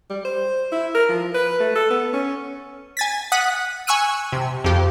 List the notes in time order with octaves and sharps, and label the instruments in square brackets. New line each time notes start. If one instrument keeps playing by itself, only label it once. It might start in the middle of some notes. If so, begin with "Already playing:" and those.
[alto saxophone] G3
C5
E4
A#4
F3
B4
A3
A4
B3
C#4
[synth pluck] G#5 A6 B6
F#5 D#6 F#6 B6
G#5 C#6 E6 F#6 D#7
C3
F2 G4